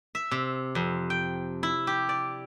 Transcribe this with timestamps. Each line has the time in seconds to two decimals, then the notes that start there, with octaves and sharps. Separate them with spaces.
0.15 E5
0.31 C3
0.75 F2
1.10 G5
1.63 E4
1.87 G4
2.09 D5